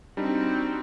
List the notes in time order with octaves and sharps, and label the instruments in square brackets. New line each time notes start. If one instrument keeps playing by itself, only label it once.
[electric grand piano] G3 D4 D#4 [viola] C4 F#4